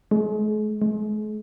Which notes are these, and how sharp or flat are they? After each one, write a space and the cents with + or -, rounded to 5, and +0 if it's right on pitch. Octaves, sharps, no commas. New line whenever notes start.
G#3 +40
G#3 +40